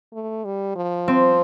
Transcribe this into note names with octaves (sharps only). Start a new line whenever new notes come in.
A3
G3
F3
C4